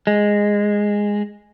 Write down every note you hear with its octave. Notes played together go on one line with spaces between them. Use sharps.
G#3